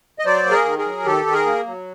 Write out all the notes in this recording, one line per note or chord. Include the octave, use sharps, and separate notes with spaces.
D#5
F#3 C5 D5
A#3
G#4 A#4
D#3
G#4 A#4
F#3
D#3 G4 A4
D#3
G#4 A#4
A#3
F#3